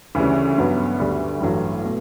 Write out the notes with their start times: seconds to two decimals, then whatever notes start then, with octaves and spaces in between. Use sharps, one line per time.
0.15 D2 C#3 E3 G3 C#4
0.58 G2 F#3 B3
1.00 D2 D3 G3
1.41 A1 G2 F#3 A3
1.84 B2 A3